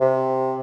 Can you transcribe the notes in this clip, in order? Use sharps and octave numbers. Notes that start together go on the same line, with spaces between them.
C3